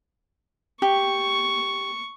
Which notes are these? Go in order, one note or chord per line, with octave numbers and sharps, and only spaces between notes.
G4 C#6